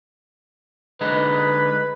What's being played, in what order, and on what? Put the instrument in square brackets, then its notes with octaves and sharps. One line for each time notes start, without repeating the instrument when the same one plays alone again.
[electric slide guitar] D3 G#3 D#4 [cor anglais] B4